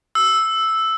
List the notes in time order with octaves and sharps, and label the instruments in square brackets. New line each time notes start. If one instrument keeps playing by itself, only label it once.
[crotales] E6